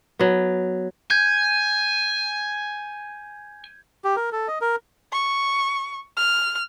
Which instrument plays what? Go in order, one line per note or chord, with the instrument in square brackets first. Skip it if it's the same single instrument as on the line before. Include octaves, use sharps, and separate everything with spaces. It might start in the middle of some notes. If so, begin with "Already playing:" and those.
[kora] F#3 B3
[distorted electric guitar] G#5 [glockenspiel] G6 G#6
[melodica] G4
A#4
A4
D#5
A#4
[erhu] C#6
F6